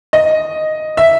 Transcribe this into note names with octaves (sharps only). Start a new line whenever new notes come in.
D#5
E5